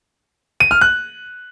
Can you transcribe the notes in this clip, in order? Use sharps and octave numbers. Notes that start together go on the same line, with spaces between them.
D#7
F6
F#6